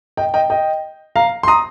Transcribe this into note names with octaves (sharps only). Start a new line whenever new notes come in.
D#5 G5
D#5 G5
D#5 G5
F5 A#5
C6
A#5 D#6